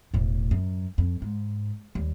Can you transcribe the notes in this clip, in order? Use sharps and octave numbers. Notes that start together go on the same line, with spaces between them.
E1 A2
F#2
F2
G#2
D#2 G3